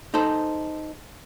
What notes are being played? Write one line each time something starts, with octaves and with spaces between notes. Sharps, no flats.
D#4 A4 C5